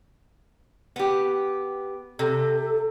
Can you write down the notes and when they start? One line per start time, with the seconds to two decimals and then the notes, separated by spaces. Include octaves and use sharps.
0.96 B3 G4
2.19 C3 A4